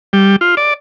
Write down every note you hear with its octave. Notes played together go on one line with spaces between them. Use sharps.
G3
F4
D5